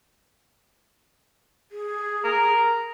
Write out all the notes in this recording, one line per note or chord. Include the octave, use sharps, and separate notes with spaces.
G#4
A#4